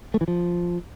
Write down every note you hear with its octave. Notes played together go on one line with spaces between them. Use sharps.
A3
E3
F3